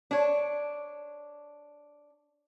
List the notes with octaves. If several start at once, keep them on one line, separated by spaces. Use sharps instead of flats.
D4 C#5